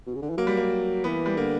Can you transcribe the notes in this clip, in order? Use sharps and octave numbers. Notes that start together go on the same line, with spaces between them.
B2
C#3
D3
E3
F#3 A#3
G3
A#3
E3 B3
G3
D3 A#3